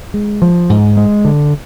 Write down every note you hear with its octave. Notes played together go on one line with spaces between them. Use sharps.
G#3
F3
G#2
G#3
D3